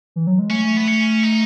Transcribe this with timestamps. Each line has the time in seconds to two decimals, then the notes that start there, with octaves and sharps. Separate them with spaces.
0.16 E3
0.27 F#3
0.39 G#3
0.50 A3 C#4
0.77 B3
0.87 C#4
1.23 D#4